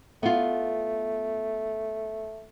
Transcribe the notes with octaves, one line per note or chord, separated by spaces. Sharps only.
A3 B3 F4